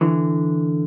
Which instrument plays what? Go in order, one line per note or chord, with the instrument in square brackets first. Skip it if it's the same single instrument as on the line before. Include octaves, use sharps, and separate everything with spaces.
[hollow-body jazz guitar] D3 E3